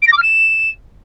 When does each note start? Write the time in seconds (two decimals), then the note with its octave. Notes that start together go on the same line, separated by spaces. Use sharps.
0.02 D7
0.07 A#6
0.12 D6
0.17 F6
0.22 E7